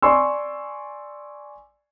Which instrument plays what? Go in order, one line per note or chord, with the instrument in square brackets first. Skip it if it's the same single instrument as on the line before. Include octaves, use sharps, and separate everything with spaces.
[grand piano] D5 G#5 C6 C#6 E6